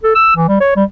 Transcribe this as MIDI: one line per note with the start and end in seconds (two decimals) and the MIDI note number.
0.04 0.14 69
0.15 0.36 88
0.36 0.47 52
0.49 0.59 55
0.61 0.74 73
0.76 0.84 55